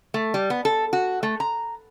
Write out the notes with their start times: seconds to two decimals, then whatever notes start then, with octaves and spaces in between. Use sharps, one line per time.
0.14 A3
0.34 G3
0.50 B3
0.65 A4
0.93 F#4
1.23 A3
1.40 A#5